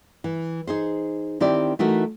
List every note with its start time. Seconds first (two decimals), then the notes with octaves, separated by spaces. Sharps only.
0.24 E3
0.67 D#4 G#4 C5
1.40 D#3 C4 E4 G4 D5
1.79 E3 A3 D#4 F#4 A#4